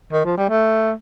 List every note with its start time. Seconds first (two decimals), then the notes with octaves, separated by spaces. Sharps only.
0.13 D#3
0.25 F3
0.37 G3
0.50 A3